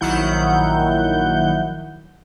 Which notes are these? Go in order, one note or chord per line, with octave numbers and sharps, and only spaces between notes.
A#1 D#3 F#3 E4 F#5 G6